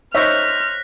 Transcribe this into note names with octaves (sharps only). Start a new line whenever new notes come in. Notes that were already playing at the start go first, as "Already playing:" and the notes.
D#4 C5 C#5 E5 F6 F#6 A#6 B6